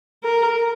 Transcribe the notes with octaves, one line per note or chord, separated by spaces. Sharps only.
A#4